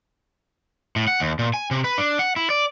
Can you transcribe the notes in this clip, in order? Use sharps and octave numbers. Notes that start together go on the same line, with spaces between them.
A2
F#5
D#2
A#2
G#5
C3
B4
D4
F#5
E4
D5